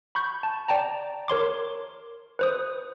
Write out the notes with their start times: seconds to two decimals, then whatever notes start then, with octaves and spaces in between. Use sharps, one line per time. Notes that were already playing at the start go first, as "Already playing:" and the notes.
0.15 B5 C#6 G6
0.43 A5
0.68 D5 G5 A5 A#5
1.28 A#4 C#5 C6 D6
2.39 B4 C5 D#6